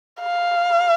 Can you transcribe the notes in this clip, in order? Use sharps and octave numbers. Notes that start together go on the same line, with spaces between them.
F5